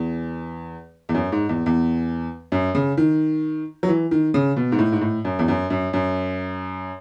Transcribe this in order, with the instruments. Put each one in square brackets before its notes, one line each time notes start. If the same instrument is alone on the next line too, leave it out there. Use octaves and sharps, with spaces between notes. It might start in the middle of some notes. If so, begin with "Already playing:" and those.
Already playing: [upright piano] E2
E2
F#2
G#2
E2
E2
F#2
C#3
D#3
F#3
E3
D#3
C#3
B2
G#2
A2
G#2
A2
F#2
E2
F#2
F#2
F#2